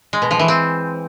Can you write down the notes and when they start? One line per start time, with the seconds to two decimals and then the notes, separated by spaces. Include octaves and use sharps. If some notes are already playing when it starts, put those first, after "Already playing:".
0.13 G#3
0.22 B2
0.31 F3
0.39 E3
0.48 C4